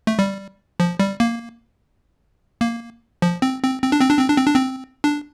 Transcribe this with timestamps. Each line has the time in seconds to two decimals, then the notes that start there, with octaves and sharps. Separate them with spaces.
0.07 A3
0.19 G3
0.80 F3
0.99 G3
1.20 A#3
2.61 A#3
3.22 F3
3.42 C4
3.63 C4
3.83 C4
3.92 D4
4.01 C4
4.11 D4
4.19 C4
4.29 D4
4.37 C4
4.46 D4
4.56 C4
5.04 D4